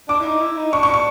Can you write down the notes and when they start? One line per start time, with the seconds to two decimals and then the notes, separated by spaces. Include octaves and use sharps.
0.08 D4 D6
0.20 E4
0.25 D#4
0.41 E4
0.57 D#4
0.72 D4 C#6
0.83 C#6
0.94 C#6